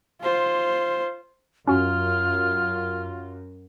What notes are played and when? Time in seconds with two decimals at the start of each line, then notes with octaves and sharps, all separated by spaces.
0.21 F4 C5
1.68 F#2 C#4 F4 F#4 F6